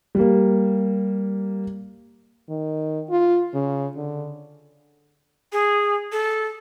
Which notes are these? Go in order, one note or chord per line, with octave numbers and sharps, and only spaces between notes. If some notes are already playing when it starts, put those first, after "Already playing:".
G3 A#3
D#3
F4
C#3
D3
G#4
A4